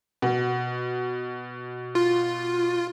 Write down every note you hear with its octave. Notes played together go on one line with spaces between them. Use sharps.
B2
F4